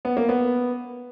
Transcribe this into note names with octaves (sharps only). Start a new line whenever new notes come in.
B3
A#3
B3